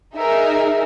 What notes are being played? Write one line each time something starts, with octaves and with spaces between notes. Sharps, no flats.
D#4 G#4 A#4 E5